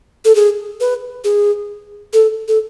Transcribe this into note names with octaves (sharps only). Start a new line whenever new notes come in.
A4
G#4
B4
G#4
A4
A4